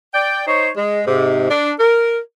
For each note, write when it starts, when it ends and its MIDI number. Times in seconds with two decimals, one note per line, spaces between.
0.14 0.42 74
0.14 0.42 79
0.47 0.69 63
0.47 0.69 72
0.47 0.69 73
0.77 1.02 56
1.07 1.50 44
1.07 1.50 48
1.50 1.71 62
1.79 2.19 70